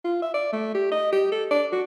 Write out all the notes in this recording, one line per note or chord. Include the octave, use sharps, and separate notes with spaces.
F4
E5
D5
A3
G4
D#5
G4
A4
D5
F#4